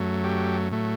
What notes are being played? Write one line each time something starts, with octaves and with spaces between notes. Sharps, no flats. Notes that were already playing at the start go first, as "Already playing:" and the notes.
Already playing: F#2 F#3 A3
G4
A2 F#3 A3